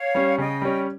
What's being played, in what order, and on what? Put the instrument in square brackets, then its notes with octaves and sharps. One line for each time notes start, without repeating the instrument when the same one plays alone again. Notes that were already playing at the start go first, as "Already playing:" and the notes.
Already playing: [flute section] C#5 F5
[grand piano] G3 C#4
[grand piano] C#3 [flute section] D#5 G5
[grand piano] G3 C#4